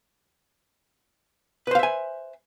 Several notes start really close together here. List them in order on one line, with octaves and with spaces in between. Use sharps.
B4 C5 F5 E5 G#5